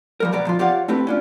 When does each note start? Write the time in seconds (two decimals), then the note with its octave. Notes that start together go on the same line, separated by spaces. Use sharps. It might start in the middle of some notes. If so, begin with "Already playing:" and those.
0.20 F3 G3 A#4
0.32 B2 B3 D5 A#5
0.47 F3 F4
0.59 F4 G4 C#5 D5 F5 F#5
0.88 A3 C4 E4 G4 B4
1.07 C#4 D4 F4